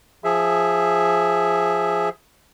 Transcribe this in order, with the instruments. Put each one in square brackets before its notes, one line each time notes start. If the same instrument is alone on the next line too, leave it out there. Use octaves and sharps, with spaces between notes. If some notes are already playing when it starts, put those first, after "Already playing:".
[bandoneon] F3 G#4 E5